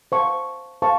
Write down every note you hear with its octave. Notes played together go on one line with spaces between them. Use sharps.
C5 F5 A5 C#6
C5 F5 A5 C#6